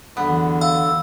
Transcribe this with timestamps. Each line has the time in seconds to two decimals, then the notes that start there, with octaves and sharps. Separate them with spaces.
0.17 E2 D3 F#3 B3
0.61 F5 E6